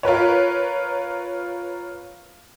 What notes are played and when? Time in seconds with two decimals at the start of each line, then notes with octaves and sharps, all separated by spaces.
0.03 F4 A#4 B4 C#5